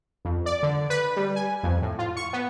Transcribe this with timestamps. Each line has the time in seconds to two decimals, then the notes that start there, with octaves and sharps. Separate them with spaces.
0.25 F2
0.46 D5
0.63 D3
0.90 B4
1.17 G3
1.36 G#5
1.63 F2
1.82 A2
1.99 F4
2.17 C#6
2.33 B3